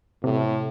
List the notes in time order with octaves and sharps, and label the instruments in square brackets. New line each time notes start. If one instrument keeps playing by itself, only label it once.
[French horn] A2 [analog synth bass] C3